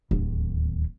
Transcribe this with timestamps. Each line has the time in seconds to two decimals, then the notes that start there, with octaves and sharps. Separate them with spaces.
0.11 D1 D#2